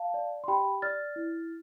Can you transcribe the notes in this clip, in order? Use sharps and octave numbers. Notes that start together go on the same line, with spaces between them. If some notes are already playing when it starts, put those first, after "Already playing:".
Already playing: F5 A5
D5
C6
G4 G5 B5
D5 F6 A6
E4